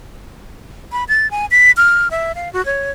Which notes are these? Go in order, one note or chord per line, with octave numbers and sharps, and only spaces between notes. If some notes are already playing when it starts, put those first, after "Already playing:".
B5
A6
G#5
B6
F6
E5
F5
F#4
C#5